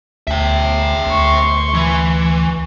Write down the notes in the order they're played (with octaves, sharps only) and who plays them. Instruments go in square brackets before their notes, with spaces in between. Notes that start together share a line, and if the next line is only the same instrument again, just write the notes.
[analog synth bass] D2 [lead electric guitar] E5 G5
[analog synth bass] D2 [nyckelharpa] C6 C#6
[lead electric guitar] E3